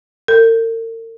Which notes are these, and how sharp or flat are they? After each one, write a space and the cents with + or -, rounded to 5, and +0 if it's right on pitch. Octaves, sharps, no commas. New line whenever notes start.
A#4 -45